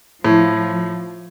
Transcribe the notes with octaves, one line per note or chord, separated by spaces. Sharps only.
A2 F3